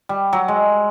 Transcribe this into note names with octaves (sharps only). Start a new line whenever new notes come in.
G3
F#3
G#3